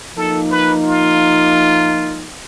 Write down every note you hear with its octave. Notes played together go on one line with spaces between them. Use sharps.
F3 A#3 D#4 A4
B4
F4